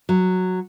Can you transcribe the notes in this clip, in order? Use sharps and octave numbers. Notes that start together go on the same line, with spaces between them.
F#3